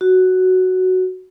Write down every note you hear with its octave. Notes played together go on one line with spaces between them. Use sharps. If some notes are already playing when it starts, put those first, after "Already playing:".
F#4